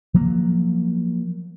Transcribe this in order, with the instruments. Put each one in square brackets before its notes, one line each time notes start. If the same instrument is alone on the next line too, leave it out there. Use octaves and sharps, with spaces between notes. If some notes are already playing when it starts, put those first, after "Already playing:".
[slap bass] F3 F#3 A#3